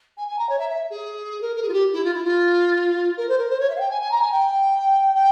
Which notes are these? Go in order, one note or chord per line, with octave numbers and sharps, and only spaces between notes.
G#5
G#5
A#5
C#5
E5
E5
G#4
A#4
A#4
G#4
F4
G4
E4
F4
E4
F4
A#4
C5
A#4
C5
C#5
E5
F5
G5
G#5
G#5
A#5
G#5
G5
G5